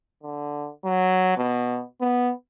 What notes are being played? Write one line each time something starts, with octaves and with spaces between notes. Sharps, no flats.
D3
F#3
B2
B3